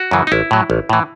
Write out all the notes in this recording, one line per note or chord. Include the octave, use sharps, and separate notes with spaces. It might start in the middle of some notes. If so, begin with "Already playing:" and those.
Already playing: F#4
F#2 C#3 E3
D#4
A1 E4
A2 F#3
A1
A2 E3